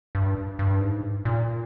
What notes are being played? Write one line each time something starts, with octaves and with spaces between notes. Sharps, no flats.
G2
G2
G#2
A#2